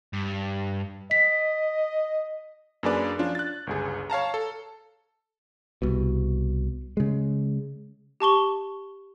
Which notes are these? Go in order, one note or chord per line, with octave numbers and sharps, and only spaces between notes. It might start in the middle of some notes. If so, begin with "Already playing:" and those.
G2
D#5 B6
F#2 A#3 D4 G#4 B4 D5
F3 C#4 D4 F4
F#6 A6
G1 C#2 G#4
C#5 F5 A5 A#5
A4
C2 B2
C#3 G#3
G4 A5 C#6 G7